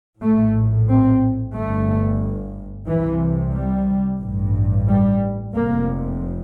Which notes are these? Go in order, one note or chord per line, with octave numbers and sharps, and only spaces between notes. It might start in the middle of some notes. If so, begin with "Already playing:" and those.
A#1 A2 A3
C4
G1 G2 A3
C2 C3 E3
G3
A1 G2
G3
F1 F2 C3 A#3